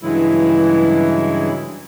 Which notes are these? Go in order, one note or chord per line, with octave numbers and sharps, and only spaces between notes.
G2 C#3 E3 F#3 G#3 E4